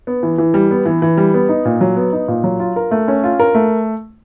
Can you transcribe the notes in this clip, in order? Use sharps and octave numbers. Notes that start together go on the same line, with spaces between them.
B3
E3
E3
G3
B3
E3
E3
G3
B3
D#4
A#2
F#3
B3
D#4
A#2
F#3
F4
A#4
A3
C#4
F4
A#4
A3